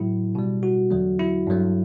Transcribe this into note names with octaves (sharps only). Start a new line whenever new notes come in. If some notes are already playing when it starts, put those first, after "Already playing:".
Already playing: A2 F#3 A3 E4
B2 G3
F#4
E2 D3 F#3 A3
E4
G2 F#3 A3